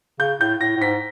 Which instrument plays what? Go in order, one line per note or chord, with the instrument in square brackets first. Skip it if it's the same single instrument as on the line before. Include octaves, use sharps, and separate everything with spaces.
[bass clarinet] C#3 [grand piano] G6
[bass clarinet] A2 [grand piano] G6
[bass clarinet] A2 [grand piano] A#6
[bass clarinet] A2
[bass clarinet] G#2 [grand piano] B6